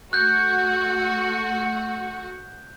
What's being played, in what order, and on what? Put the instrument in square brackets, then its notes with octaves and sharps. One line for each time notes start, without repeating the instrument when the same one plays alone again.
[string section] A3 F#4 [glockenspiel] F#6 G6